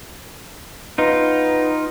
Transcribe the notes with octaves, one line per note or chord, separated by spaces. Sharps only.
B3 D#4 F4